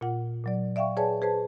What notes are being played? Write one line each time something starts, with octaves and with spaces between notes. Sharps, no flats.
A#2 F4 F#5
A#2 F#3 D5
D5 E5 F5 G5 C#6
G#4 B4 C#5 D5 G#5 A5
G#4 B4 C5 A5